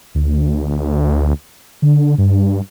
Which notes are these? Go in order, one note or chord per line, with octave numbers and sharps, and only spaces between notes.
D2
D3
G2